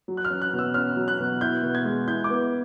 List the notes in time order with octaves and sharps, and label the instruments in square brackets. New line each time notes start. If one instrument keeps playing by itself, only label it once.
[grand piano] F#3
[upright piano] F#6
F6
[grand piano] C#4
[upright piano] F#6
[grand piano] B2
[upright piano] E6
[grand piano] C#4 [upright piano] F6
[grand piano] F#3
[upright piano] F#6
[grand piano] B2
[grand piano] E4 [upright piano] G6
[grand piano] B2
[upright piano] G#6
[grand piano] G#3
[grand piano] E4 [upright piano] G6
[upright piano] D6
[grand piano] B3